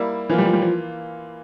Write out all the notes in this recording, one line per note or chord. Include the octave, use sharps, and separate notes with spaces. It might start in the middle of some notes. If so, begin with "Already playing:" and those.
Already playing: G3 A#3 E4
E3 F3 A#3 F4
G3
F3
G3
F3